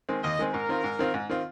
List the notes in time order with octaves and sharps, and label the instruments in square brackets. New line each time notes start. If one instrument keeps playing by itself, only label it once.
[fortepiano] D#3 G#3 C4
[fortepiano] D#2 [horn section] D#5
[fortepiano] D#3 G#3 C4
[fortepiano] G#2 [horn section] A#4
[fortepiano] D#3 C4 F4
G#2
D#3 C4 F4
G#2
D#3 C4 F4